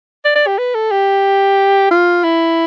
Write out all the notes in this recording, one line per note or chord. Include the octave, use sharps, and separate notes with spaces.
D5
D5
G4
B4
A4
G4
F4
E4